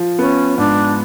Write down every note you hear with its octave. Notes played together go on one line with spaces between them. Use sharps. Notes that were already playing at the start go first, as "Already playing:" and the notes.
Already playing: F3
B3 C#4
G#2 D4